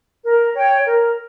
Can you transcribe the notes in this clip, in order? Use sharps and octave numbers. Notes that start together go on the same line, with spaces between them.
A#4
C#5 G5
A#4